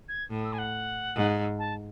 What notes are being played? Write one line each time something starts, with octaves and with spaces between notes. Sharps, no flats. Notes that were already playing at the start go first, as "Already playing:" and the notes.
G#6
A2
E6
G#5
F#5
G#2
A5